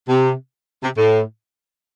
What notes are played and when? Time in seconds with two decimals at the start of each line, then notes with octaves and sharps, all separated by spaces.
0.08 C3
0.83 C3
0.97 A2